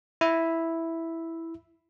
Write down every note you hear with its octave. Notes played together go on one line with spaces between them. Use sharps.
E4 E5